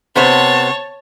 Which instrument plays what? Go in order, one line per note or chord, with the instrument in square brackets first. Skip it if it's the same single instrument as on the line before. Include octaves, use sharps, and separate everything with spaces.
[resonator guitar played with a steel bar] C3 B3 C5 [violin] C#5 A5